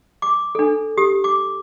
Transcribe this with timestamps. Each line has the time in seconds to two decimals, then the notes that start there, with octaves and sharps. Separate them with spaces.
0.22 D6
0.55 D4 A4
0.97 G4 D#6
1.24 D6